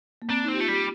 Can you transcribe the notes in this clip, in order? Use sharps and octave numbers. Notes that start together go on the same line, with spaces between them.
A#3
C4 D4
D#4
C4
G4
F4
A3
G3 G4